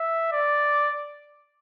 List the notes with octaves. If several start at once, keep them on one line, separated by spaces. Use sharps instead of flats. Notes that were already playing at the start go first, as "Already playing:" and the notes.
Already playing: E5
D5